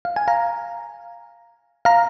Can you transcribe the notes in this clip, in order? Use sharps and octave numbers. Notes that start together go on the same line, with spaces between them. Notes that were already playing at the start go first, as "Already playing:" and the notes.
F5
G#5
F5 A#5
F5 A#5